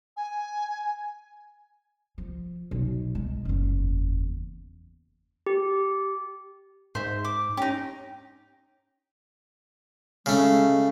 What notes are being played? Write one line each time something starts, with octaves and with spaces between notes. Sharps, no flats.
G#5
F3
B1
G#3
F#1 E2
G4
G#2 C5 E5
D6
C#4 D#4 G4
C#3 G#3 A3